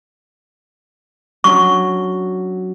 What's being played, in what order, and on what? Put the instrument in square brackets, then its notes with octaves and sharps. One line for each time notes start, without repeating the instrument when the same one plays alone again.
[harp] F#3 C#4 D4 [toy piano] C#6